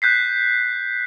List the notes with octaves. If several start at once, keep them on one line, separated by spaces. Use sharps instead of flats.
F#6 G6 B6 C7